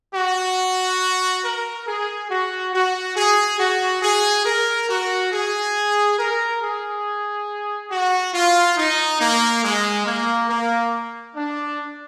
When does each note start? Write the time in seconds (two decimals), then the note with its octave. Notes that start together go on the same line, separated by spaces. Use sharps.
0.15 F#4
1.44 A#4
1.88 G#4
2.31 F#4
2.74 F#4
3.16 G#4
3.60 F#4
4.03 G#4
4.46 A#4
4.89 F#4
5.32 G#4
6.19 A#4
6.61 G#4
7.91 F#4
8.34 F4
8.77 D#4
9.20 A#3
9.64 G#3
10.06 A#3
10.50 A#3
11.36 D4